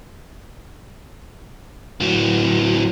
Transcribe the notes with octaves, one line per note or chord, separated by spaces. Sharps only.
A2 F#3